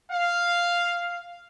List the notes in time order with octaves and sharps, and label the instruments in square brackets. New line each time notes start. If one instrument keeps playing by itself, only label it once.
[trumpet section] F5